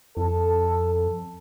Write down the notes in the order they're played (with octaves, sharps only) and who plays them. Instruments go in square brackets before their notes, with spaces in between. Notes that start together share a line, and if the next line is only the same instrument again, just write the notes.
[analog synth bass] F2 [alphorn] A4